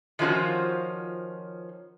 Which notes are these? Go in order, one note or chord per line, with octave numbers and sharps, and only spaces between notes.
D#3 F3 C#4 F4 F#4 C5